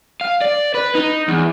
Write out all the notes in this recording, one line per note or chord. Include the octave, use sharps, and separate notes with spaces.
F5
D5
B4
D#4
E2